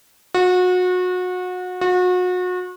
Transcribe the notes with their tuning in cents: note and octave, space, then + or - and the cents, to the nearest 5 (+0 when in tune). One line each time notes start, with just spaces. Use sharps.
F#4 -30
F#4 -35